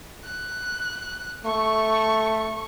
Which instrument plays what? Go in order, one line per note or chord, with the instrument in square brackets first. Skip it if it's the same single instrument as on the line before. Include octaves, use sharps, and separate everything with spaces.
[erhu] F#6
[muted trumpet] A3 [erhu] C#6